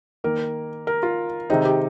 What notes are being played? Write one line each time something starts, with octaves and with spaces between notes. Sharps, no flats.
D#3 A#3 A#4
A#4
F4
C3 D#3 G#3 C4 D#4
G4